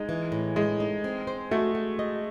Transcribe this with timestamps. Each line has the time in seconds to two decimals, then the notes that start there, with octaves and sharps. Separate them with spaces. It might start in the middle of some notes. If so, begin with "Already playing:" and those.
Already playing: G#3 D#4
0.09 E3
0.32 A2
0.56 G#3 A3
0.80 D#4
1.04 C4
1.27 C5
1.51 A3 F#4
1.75 F#4
1.99 D#5